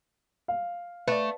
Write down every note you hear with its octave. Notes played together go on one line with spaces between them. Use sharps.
F5
A3 B4 D5